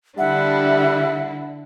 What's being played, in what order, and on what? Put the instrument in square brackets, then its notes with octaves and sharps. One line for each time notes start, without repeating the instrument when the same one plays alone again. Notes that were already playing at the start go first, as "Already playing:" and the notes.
[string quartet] D3 D4 E4 [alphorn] G3 [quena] E5 [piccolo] F#5